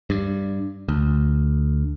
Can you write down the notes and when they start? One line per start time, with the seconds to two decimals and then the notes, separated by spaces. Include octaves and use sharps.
0.10 G2
0.89 D2